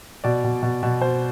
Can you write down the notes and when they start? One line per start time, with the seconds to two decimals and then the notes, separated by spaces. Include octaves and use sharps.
0.24 B2 D5
0.44 B2
0.63 B2
0.83 B2
1.01 B2 C5